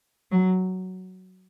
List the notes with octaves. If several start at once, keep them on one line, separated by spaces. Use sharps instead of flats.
F#3